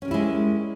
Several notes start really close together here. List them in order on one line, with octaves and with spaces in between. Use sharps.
C#4 A#4 G3 E4 G#3